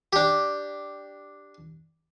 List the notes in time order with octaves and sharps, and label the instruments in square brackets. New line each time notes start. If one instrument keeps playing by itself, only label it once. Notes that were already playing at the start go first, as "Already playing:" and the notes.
[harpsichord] D4 G4